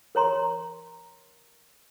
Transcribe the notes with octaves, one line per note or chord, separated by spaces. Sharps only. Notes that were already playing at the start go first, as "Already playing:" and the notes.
A#4 C#5 A#5 C6